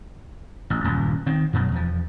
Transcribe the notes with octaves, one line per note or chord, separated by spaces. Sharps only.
A1
D#1 C#2 G2
D#3 C4
F#2 B2 F#3
E2 F3